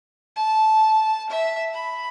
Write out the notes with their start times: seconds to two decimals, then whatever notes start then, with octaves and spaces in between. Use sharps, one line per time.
0.36 A5
1.30 E5
1.73 B5